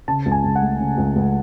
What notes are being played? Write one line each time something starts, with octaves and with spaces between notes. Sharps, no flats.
C#3 A5
C#2
G#5
C#2
F#5
A3
C#3
C#2
C#2